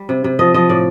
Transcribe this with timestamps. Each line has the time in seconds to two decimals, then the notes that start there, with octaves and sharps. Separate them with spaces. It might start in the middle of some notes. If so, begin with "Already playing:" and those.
Already playing: G3
0.09 C3
0.24 C3
0.39 F3 D#5
0.54 F3 D#5
0.69 A2 D5